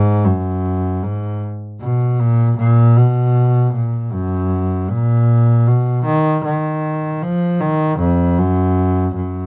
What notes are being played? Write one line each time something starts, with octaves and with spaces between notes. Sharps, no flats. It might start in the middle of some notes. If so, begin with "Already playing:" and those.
Already playing: G#2
F#2
G#2
B2
A#2
A#2
B2
A#2
F#2
A#2
B2
D#3
D#3
F3
D#3
F2
F#2
F#2